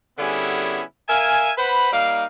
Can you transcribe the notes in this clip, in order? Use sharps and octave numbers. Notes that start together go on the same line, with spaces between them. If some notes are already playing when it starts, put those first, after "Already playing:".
D3 G3 B3 C#4 E4 G#4
A#4 E5 F5 G#5
B4 C5 F#5 B5
G3 A#3 D#4 F5